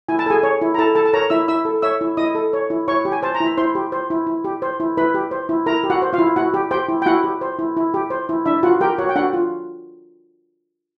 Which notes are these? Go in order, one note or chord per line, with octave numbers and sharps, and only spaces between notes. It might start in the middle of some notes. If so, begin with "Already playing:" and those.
E4 G#5
A5
G#4 A4 G#5
C#5
E4
A#5
E4 A4 A5
A4 A5
A5
A#4 C#5 A#5
E4 E5 E6
E4 E5 E6
A4
C#5 E5 E6
E4
E4 D#5 D#6
A4
C#5
E4
E4 C#5 C#6
G4
G#5
C5 A5
A#5
E4
B5
E4 C5 C6
G4
C5
E4
E4
G4
C5
E4
E4 B4 B5
G4
C5
E4
E4 A#4 A#5
G4
F#4 F#5
C5
F4 F5
E4
E4 F#4 F#5
G4
G4 C5 G5
E4
G5
E4 F#4 F#5
G4
C5
E4
E4
G4
C5
E4
D4 E4 E5
F4 F#4 F#5
G4 A#4 G5
F#4 C#5 F#5
G5
D4 F#4 F#5
F4